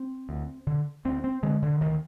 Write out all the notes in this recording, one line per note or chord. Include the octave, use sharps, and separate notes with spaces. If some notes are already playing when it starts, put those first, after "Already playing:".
Already playing: C4
D2
D3
D2 C4
C4
D3 G#3
D3
D2 D#3